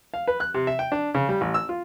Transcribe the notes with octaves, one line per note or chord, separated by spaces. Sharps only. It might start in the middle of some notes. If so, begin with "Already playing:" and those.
F5
B4
F#6
C3
E5
G5
D4
C#3
G3
A1
E6
F4